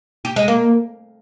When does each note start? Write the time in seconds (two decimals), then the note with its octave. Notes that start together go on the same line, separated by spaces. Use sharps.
0.25 G4
0.36 G#3
0.48 A#3